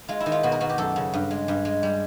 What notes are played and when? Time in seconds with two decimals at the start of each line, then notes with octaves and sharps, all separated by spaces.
0.08 G#3 F4
0.20 E4
0.26 D#3
0.32 F4
0.43 B2 F#4
0.52 A#4
0.61 B2 F#4
0.69 G4
0.78 F#2 A4
0.96 C#3
1.13 G2
1.31 G#3
1.48 G2
1.65 G#3
1.83 G3